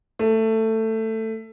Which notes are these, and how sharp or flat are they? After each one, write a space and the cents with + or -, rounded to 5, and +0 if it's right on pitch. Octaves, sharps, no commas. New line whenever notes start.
A3 +15